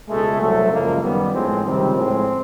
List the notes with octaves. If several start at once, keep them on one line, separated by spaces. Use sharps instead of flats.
C#2 B2 G#3 A3
C2 A#2 F#3 A3
F#2 C#3 F3 G#3 A#3
F#2 D#3 G3 B3
A2 F3 G#3 C4
C#2 C3 D#3 G3 C4
A2 F3 G#3